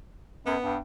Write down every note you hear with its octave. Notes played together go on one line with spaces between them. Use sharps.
F#2 B3
G2